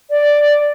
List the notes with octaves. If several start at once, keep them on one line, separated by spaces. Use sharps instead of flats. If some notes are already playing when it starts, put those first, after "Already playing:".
D5